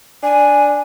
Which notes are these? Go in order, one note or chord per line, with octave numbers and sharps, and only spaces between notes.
D4 G#5